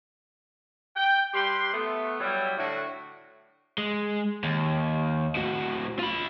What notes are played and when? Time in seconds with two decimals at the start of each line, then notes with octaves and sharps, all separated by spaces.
0.96 G5
1.34 G3 G4 B4 C6
1.73 A3 B3
2.20 F#3 G3 E4
2.57 A2 D3 F#4
3.78 G#3
4.44 D#2
5.35 A2 F#4
5.99 F4 B5